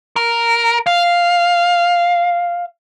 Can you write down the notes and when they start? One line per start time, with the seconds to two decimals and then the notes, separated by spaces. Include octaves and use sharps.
0.16 A#4
0.87 F5